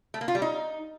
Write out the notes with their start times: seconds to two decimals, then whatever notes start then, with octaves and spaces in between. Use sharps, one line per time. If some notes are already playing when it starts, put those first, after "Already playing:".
0.14 A3
0.21 A#3
0.28 F4
0.35 G3
0.42 D#4